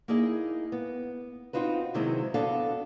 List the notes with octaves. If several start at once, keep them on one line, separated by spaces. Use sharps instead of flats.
A#3 D#4 E4 G#4 D#5
B3
C4 D#4 F4 F#4 B4
C3 D#3 F#3 G#3 C4 E4
B3 D4 F#4 A4 F5